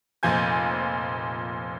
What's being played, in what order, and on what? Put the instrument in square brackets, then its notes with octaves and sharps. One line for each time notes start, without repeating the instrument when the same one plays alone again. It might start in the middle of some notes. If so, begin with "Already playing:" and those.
[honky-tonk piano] F1 A#2 F3 G#5 G6